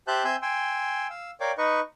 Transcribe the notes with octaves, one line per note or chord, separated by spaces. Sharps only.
G4 C5 E5 A5 F#6 G6
C4 E5 G#5 C6 E6 G6
G5 G#5 C6 E6
F5 E6
A#4 C#5 D5 F5 G5 D6
D#4 B4 D#5 C#6